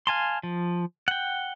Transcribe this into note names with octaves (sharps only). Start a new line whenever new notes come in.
F5 G#5 A5 C6
F3
F#5 G5